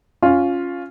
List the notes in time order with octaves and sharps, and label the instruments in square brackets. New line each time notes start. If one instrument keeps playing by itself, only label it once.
[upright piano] C#4 F4